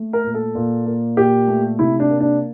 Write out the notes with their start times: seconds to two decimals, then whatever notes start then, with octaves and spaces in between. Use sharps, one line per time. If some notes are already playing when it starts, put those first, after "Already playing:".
Already playing: A3
0.13 A#4
0.24 A#2
0.34 A4
0.55 A#2
0.86 A#3
1.17 A#2 G4
1.48 A3
1.79 C3 E4
2.00 D4
2.10 A#3
2.20 D4